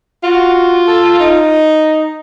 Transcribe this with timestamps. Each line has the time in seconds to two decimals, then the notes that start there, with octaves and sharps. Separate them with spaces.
0.24 F4 F#4
0.87 A4
1.20 D#4